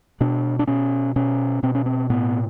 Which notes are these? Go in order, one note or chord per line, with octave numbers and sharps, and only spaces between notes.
B2 D4
D4
B2 C#4
B2 C#4
B2 C4
C#4
C4
A2 B3